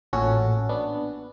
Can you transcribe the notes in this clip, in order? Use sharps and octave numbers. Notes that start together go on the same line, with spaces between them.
A1 A#2 C#4 F#4 A4
B3 D4